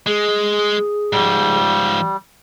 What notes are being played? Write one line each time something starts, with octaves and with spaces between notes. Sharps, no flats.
G#3 G#4
G#2 F3 G3